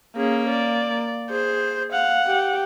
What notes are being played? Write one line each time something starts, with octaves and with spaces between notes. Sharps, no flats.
A#3 C#4 G#4
D5
G#4 C5
F5 F#5
G4